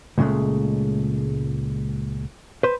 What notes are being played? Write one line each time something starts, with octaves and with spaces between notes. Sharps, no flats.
C#2 A#2 C#3 G#3 A3
B4 C5